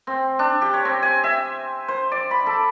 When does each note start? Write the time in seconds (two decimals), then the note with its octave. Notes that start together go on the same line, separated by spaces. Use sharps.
0.07 C4
0.39 D4
0.61 G4
0.73 C#5
0.85 C4
1.03 G#5
1.24 E5
1.88 C5
2.12 D5
2.31 B5
2.46 A4